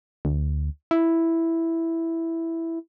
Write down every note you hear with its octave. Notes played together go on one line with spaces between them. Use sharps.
D2
E4